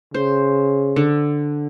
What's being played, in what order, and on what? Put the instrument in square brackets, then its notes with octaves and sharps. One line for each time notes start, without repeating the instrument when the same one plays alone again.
[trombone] C#3 [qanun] C5
[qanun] D3